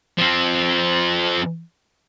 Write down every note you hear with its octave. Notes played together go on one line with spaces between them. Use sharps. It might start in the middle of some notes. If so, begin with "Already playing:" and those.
F3 C4